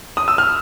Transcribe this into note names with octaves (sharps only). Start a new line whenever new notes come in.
D#6
E6
F6